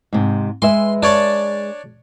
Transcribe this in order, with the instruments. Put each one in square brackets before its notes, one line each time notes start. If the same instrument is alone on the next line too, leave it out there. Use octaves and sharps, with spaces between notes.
[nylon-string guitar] G#2 C3
[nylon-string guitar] G#3 B4 E5 [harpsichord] C6
[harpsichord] D4 C#5 D5